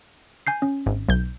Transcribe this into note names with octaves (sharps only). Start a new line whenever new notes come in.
G#5 G6 C7
C#4
G#1
B1 G6